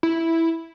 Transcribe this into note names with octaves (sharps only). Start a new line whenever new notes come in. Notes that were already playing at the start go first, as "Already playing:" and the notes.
E4